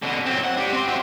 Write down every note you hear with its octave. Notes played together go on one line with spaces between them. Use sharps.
B2 D3
F#3 C4
F#5
D4 G4
C4 C6
F#4 E5